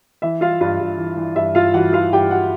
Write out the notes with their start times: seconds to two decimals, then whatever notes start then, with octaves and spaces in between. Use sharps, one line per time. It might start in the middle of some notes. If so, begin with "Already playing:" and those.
0.22 E3 E5
0.41 E3 F4 F5
0.61 G2 F4 F5
0.80 G2
0.98 E3
1.17 E3
1.36 G2 E5
1.55 G2 F4 F5
1.74 E3 F#4 F#5
1.93 E3 F4 F5
2.12 G2 G4 G5
2.31 F#4 F#5